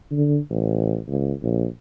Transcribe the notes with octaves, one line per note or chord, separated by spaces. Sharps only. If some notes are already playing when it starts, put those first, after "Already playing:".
D3
A1
C#2
A#1